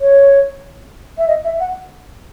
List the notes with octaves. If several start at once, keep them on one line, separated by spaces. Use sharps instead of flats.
C#5
E5
D#5
E5
F#5